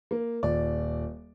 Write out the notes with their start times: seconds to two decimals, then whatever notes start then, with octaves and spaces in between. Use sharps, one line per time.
0.11 A#3
0.43 D#1 D5